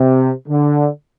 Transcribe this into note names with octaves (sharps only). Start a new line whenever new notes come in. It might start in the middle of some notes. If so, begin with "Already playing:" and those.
Already playing: C3
D3